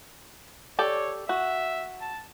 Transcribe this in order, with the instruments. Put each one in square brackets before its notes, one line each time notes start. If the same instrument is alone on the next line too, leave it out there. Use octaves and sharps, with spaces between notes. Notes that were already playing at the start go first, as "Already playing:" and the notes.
[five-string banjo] G4 A4 D5 [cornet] C#5
[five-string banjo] F#4 [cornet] E5
[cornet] A5